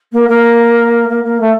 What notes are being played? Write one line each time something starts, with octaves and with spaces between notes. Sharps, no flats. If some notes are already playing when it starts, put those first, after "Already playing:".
A#3
A#3
A#3
A#3
A3